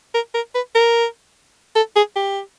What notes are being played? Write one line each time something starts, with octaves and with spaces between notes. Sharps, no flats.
A#4
A#4
B4
A#4
A4
G#4
G4